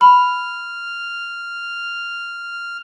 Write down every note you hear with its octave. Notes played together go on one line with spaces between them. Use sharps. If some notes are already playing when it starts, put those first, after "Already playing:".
B5 F6